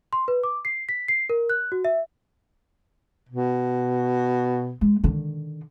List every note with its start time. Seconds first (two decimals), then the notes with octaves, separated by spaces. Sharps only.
0.13 C6
0.28 B4
0.44 D6
0.65 C7
0.89 B6
1.08 C7
1.30 A#4
1.50 F#6
1.72 F#4
1.85 E5
3.29 B2
4.81 G#3
5.04 D3 D#3